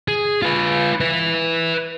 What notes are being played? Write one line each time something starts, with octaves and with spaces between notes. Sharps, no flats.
G#4
F4 B4
B4 E5